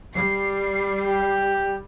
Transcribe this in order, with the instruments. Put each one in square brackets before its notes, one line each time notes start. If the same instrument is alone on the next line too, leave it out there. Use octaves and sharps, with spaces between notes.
[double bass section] G3 [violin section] C7
[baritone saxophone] G4